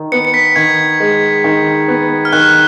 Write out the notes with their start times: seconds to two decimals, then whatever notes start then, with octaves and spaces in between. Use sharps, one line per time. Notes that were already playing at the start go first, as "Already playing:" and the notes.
Already playing: D#3
0.12 B3 C#7
0.25 C#7
0.34 B6
0.56 D#3 G#6
1.00 G#3
1.44 D#3
1.88 B3
2.25 F6
2.32 D#3 F#6